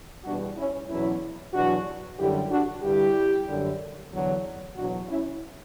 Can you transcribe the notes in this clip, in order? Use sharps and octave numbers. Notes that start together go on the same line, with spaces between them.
E2 B2 G3 D4 F#4
C#4 E4
E2 B2 F#3 C#4 E4
E2 B2 F#3 D4 F#4
F#2 D3 G3 E4 G4
D4 F#4
G2 D3 G3 E4 G4
F#2 D3 G3
E2 D3 F#3
E2 B2 F#3 D4 F#4
C#4 E4